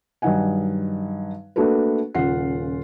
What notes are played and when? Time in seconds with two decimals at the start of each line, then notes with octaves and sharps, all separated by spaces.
0.22 G2 D#3 F#3 D#4 F#5 G#5
1.56 A3 A#3 D4 F#4 A4 B4
2.15 D#1 C#3 F4 F#5 C7